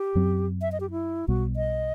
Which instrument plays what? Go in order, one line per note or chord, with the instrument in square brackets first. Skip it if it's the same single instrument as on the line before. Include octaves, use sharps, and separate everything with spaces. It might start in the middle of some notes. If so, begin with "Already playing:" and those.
Already playing: [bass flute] G4
[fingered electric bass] F#2 F#3 C4
[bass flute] E5
D#5
G4
E4
[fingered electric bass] B1 B2 G3 B3 [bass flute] F#4
[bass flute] D#5